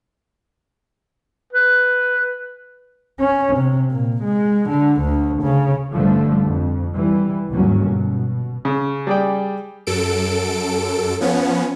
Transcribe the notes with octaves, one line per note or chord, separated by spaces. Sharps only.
B4
C#4
C3
A#2
G#3
D3
D2
C#3
A1 G2 D3 F3 G3 A3
F2
E3 G3
G1 D#2 G#2 F#3 C#4
B2
C#3
G3 G#4 D5 G5
F#2 A4 D7
F3 B3 C#4